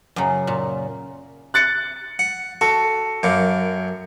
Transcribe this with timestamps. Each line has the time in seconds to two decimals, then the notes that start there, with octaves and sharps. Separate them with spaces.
0.16 F#2 C#3
0.47 A#2
1.54 F#6 A6 C#7
2.19 F#5
2.61 F#4 A4
3.23 F#2 A#3